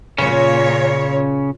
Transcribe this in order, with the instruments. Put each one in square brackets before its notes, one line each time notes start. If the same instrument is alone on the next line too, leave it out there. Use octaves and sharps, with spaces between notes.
[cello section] A#2 C#5 [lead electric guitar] C#3 C#4